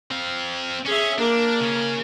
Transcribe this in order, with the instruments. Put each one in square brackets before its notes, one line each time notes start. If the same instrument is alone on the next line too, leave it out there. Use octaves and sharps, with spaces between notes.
[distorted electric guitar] C4 F5
[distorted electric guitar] C#4 [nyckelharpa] G#4 E5
[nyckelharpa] A#3 A#4 [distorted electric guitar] D4
[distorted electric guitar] C#3 C#4